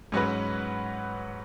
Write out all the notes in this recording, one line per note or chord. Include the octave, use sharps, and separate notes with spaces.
G#2 F#3 C#4 F#4 B4